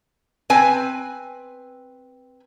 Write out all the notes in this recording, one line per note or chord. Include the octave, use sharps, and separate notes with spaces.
C4 B4 G#5